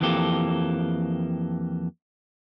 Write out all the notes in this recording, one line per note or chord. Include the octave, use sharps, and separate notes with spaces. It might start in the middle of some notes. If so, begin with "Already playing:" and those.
F2 E3 F3 A#3 G4 A4